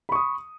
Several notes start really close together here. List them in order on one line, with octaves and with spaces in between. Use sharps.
B5 C#6 D#6